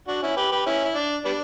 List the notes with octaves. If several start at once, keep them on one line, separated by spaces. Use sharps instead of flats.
D4 F#4
C#4 E4
G4 B4
G4 B4
C#4 E4
E4
D4
G3 B3 D4